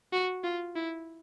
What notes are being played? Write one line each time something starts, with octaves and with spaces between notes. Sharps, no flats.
F#4
F4
E4